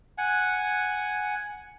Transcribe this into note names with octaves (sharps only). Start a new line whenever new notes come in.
F#5 G#5